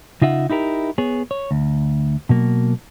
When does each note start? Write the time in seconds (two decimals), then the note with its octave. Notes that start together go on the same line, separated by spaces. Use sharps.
0.22 C#3 D#4 F4 E5 F#5
0.50 D#4 E4 G4 A#4
0.98 B3 G#4 C#5
1.31 C#5
1.51 D2
2.29 B2 F#3 A#3